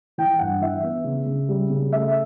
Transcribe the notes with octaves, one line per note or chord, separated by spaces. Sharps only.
E3 G5
G2 F#5
E3 E5
B3
C#3
C#3
G3
C#3
A3 E5